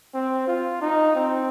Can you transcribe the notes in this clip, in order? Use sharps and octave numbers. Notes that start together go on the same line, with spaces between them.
C4
F4
D#4
C4